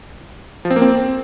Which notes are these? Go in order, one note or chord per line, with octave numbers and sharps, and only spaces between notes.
F3
C4
A#3
C4